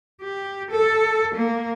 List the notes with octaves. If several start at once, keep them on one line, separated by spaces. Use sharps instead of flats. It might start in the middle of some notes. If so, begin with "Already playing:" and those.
G4
A4
A#3